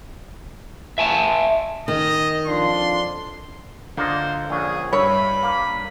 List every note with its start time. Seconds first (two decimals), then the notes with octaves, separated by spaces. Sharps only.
0.98 E5 G#5 A5
1.88 D#3 D#5
2.46 F2 D4 F4 C6
3.97 D3 A#3 F4 C5 D#5
4.50 A#1 C#4 G#4
4.93 G2 E4 C#5 B5
5.43 A#3